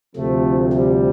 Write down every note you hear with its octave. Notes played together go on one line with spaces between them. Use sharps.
D2 C3 F3 A3 C4
G3